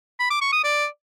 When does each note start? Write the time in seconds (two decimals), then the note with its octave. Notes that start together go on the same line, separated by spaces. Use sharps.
0.19 B5
0.30 D6
0.42 C#6
0.53 D#6
0.64 D5